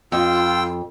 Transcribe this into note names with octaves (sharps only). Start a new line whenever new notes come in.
F2 F4 G5 E6